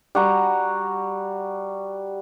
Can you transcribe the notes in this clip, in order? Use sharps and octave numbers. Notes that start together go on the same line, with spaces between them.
G3 F#4 A#5